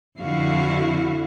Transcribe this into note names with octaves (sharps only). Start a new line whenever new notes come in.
F2 D3 E4 F#4 F5